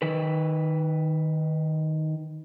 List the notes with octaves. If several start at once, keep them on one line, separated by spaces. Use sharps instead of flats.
D#3 B4